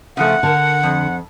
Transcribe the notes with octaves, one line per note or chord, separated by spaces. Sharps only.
C#3 F3 A3 F#5
D3 A#4 A5
F2